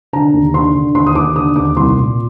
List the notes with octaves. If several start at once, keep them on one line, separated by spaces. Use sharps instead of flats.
D3 A#5
D#2
D3 C6
D3
D#2 C6
D#6
D#2 D6
D3 D#6
D#2 D6
C2 C6
A#2